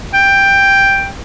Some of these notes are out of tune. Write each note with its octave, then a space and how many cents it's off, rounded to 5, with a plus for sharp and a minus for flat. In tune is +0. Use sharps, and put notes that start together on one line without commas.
G5 +10